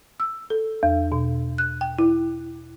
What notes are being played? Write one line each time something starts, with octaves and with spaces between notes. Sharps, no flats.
E6
A4
E2
B2
F#6
G5
E4